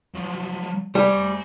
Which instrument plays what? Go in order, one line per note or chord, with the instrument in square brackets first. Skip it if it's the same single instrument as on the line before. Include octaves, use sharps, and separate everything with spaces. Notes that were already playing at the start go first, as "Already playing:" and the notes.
[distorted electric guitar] F3 F#3
[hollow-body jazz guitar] G3 [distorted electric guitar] C5 G#5